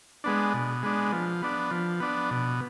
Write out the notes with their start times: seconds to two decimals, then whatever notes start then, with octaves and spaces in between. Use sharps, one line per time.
0.24 G#3 B3 D4
0.54 B2
0.83 G#3 B3 D4
1.12 F3
1.42 B3 D4
1.71 F3
2.00 B3 D4
2.31 B2